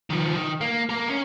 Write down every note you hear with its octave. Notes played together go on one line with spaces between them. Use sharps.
D#3 F3
D#3
A#3
A#3 A#4
C#4